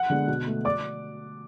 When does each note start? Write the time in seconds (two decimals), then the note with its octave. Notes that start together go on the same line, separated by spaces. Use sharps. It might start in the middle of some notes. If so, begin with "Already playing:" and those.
Already playing: F#5 F#6
0.10 D3 G#3 B3
0.28 B2
0.47 A3
0.65 D5 D6